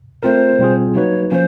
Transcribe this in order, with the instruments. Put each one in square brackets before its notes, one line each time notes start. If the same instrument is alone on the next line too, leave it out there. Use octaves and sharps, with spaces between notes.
[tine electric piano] A3 C4 F4 A#4 [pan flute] C5
[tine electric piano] B2 G3 C4 F4 G#4
[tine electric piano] F#3 A#3 D#4 F#4 B4 [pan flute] C#5
[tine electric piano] F3 A#3 C#4 [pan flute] C5